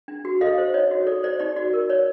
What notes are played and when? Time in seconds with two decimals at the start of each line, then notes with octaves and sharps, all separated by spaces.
0.08 D4
0.25 F#4
0.41 A4 D#5 F5
0.58 C5
0.74 D#4 C#5 D#5
0.91 F#4
1.06 A4 D5
1.23 C5 D5
1.39 D#4 D5
1.56 F#4 D5
1.73 A#4
1.89 C#5 D5